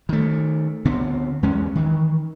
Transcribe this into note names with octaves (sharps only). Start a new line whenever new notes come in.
D#3 A3
D2 D3 B3 C4
E2 G#3 C#4
D#3 E3